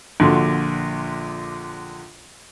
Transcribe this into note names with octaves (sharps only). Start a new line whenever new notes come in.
A#1 A#2 D3 F#4 C6